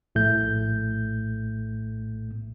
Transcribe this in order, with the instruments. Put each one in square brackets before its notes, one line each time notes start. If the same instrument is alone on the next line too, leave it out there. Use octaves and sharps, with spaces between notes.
[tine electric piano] A#1 A2 A3 G6